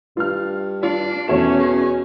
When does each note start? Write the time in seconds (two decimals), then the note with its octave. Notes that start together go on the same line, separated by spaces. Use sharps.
0.17 G2 F4 F6
0.83 D4 F4 D5
1.28 E2 B2 A3 C#4 C#5 E7
1.60 G#4